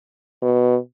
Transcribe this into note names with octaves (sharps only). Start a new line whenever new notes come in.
B2